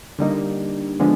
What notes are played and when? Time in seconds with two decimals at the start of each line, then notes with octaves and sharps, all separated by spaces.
0.19 D3 G3 A#3 D#4
0.99 D3 F3 G#3 B3